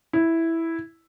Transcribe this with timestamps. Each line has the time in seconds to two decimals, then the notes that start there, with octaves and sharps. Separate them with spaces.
0.13 E4